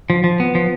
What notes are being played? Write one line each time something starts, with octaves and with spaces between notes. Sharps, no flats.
F3
F3
B3
F3